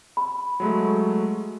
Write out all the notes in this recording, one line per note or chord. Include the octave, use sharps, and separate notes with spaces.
B5
F#3 G#3 A3